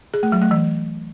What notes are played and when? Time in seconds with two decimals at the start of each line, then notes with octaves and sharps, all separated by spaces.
0.14 G#4
0.23 A3
0.32 F#3
0.42 A3
0.51 E3